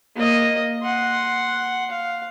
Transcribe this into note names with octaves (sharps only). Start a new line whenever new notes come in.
A#3 D#5
F#5 C6
F5